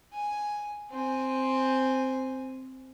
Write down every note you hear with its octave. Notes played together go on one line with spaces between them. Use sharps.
G#5
C4 G#5